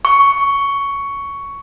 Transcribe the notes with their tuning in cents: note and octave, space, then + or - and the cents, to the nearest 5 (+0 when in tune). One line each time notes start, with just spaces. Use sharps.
C#6 +10